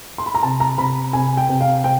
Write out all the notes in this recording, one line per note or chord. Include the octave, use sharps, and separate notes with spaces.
C6
B5
A#5
C3 A5
A#5
C3 B5
C3 G#5
G5
C3
F5
C3 G5